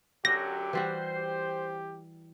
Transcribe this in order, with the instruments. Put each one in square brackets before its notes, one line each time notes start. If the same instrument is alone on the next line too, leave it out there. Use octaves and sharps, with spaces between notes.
[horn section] F#2 D3 F#3 [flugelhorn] G4 [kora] G5 [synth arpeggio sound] A#6
[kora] E3 G3 F#4 [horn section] C5
[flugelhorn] G4